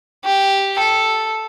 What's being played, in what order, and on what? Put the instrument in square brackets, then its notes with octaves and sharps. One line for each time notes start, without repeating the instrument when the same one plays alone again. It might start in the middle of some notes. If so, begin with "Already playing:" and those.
[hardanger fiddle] G4
A4